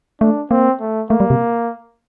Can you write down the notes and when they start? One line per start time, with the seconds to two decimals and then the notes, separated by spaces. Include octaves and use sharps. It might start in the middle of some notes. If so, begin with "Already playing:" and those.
0.21 A3 D4
0.51 A#3 C4
0.81 A3
1.10 A3 A#3
1.20 G3
1.30 C3